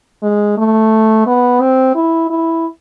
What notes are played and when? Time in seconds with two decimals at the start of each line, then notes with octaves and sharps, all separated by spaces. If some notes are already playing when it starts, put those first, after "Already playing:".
0.23 G#3
0.57 A3
1.26 B3
1.60 C4
1.95 E4
2.30 E4